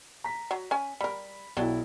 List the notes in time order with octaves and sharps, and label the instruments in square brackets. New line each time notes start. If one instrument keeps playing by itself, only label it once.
[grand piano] A#5 B6
[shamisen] F#3
C#4 G#5
[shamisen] G3 A#4 [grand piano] B5
[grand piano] B1 E4 [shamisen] F#3 D4 G4